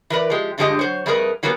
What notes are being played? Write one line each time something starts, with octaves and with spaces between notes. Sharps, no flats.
E3 A#4 B4 D5
F3 G#3 G4
G2 D3 F3 G#3 G4 D#5
F#3 C5 C#5
F2 G3 A3 G#4 A#4 B4
E3 F#3 G3 A#3 B3